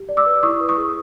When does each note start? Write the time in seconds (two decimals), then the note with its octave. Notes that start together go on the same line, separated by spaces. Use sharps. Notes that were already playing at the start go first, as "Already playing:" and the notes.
Already playing: G4
0.09 D5
0.17 D6 E6
0.26 B4
0.43 E4 C#6 D#6
0.61 B4
0.69 C#6 D#6
0.77 G#4